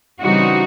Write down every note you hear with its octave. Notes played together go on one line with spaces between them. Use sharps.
C#3 E3 G3 C4 D#4 F#4